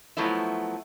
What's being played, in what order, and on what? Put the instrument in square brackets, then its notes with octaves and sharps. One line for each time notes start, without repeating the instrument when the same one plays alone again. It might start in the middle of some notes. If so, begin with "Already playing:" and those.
[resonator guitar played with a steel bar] F3 F#3 A3 B3 E4